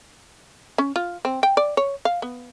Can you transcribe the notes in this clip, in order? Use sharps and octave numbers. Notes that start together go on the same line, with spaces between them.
C#4
F4
C4
G5
D5
C#5
F5
B3